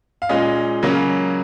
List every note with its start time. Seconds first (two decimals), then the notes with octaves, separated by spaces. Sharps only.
0.22 F5
0.29 A#2 G#3 C#4 D#5
0.83 C#3 F#3 A#3 C#4